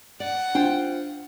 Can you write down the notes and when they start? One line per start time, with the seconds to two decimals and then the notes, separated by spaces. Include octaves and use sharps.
0.20 D5 F#5
0.55 D4 F4 C5 G5